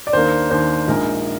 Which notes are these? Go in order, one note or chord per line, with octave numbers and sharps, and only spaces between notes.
D5
D#2 D#3 A#3 D4 C5
D#2 D#3 A#3 D4 C5
A#1 A#2 G#3 D#4 A#4